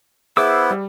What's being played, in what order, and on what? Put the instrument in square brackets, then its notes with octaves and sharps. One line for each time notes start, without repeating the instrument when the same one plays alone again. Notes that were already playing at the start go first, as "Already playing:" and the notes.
[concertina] B3 E4 [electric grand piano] G#4 [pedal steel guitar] C5 D6 E6 [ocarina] E5
[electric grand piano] G3